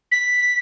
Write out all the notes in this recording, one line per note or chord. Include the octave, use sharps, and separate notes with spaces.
B6